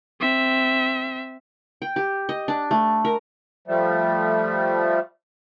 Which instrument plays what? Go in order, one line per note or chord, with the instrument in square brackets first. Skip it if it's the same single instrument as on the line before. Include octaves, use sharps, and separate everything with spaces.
[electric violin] C4 E5
[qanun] G5
G4
D#5
D4
A3
A#4
[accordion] F3 G3 A3